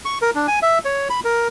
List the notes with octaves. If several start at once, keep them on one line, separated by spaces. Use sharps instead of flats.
C#6
A#4
D4
G#5
E5
C#5
B5
A#4